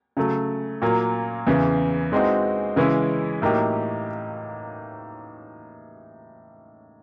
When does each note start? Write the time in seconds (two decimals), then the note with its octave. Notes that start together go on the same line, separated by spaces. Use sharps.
0.17 C#3 F#3 A3
0.82 A#2 F#3 A#3
1.47 E2 C#3 E3
2.12 E3 G#3 C4 D#4 F#4
2.76 C#3 E3 G#3 C#4 E4
3.42 A2 F#3 A#3 D#4 G4